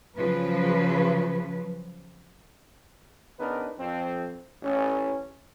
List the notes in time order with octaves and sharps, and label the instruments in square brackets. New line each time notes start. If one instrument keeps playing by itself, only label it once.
[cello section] C#3 F3 F#3 B4
[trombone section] C#3 B3 D4 D#4 A#4 B4
F2 C4
A1 C#4